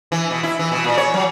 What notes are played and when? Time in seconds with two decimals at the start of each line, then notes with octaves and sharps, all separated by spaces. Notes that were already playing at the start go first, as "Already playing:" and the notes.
0.12 E3
0.31 B2
0.43 E4
0.59 E3
0.72 B2
0.84 A#2
0.97 C#5
1.14 F#3